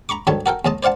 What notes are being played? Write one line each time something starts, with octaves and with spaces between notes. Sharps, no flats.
A#5 B5 C#6 D6
D2 G#2 D#3 G3 C#5 A5
F#4 A4 A#4 G5
D#2 G#3 D#5 A5
C5 D5 F5 F#5 A5